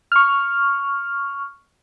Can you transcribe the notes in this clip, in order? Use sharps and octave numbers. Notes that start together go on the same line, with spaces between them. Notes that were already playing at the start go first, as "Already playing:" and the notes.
C#6 F6